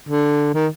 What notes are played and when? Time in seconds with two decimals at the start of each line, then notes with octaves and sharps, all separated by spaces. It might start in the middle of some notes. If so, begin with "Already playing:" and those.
0.09 D3
0.54 D#3